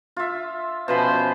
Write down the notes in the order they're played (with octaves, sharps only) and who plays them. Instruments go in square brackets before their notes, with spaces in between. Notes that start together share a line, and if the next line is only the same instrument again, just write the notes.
[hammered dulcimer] F4 E5
[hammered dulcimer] B2 F3 B5 [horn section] C#4 B4 C5